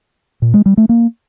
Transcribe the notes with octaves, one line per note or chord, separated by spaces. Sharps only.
A#2
G#3
G3
A3
A#3